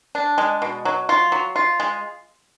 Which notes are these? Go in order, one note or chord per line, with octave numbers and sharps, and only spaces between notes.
D4
G#3
B2
F#3
F4
F#3
F4
G#3